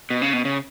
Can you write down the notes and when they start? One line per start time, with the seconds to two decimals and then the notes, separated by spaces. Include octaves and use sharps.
0.10 B2
0.22 C#3
0.33 B2
0.45 C#3